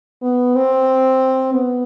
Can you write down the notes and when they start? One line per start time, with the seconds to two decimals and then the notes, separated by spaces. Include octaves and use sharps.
0.22 B3
0.55 C4
1.53 B3